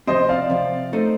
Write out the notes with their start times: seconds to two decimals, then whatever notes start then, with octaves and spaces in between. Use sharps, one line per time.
0.07 C3 F3 C4 C5 D#5
0.29 D5 F5
0.50 C3 F3 C4
0.93 A3 D#4 A4 C5 D#5